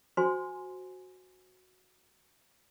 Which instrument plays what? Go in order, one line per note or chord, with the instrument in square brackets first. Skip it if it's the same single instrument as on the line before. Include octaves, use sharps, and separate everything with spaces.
[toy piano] F#4 C5 G#5 C6